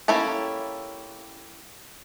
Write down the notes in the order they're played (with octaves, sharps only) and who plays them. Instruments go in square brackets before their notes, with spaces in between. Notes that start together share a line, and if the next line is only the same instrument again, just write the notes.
[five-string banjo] A#3 C#4 E4 G4 A4